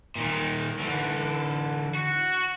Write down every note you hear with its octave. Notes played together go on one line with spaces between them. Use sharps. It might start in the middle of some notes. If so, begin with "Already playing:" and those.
A#2 D#3
D3 E3
F#4